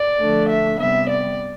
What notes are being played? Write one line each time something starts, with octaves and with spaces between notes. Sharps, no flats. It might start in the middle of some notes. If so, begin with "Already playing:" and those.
Already playing: D5
D3 F3 A3 D4
E5
C3 G3 B3 E5
D5